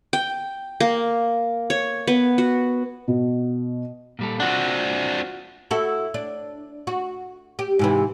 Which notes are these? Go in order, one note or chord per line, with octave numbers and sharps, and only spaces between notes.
G5
A#3
C#5
B3
F#4
B2
A#2 G3 A4
C4 D4 F4 F#4 F#5
E4 F#4 A4
D4
F#4
G4
G#2 C3 E3